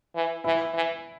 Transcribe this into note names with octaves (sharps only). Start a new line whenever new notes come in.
E3
E3 E4
E3